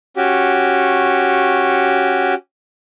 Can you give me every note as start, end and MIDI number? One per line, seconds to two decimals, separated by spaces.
0.17 2.34 61
0.17 2.34 66
0.17 2.34 67